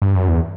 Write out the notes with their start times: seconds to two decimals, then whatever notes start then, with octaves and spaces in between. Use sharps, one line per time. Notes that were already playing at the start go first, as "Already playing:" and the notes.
0.02 G2
0.15 F#2
0.28 E2